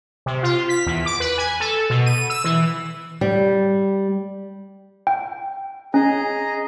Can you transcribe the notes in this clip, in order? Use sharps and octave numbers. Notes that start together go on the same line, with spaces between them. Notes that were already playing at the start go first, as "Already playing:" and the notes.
C3
F4
B6
E2
D6
B4
G#5
A4
B2
D#7
E6
E3
G3
G5
C#4 G#4 D#5 A#5